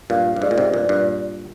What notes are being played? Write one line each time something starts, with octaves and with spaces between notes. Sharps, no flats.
G2 A#2 F5
G2
G#2 D5
A#2
G#2 C3
G2 A#2
G2 A#2